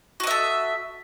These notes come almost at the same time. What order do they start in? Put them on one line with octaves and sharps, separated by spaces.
F#4 D#5 E5 A4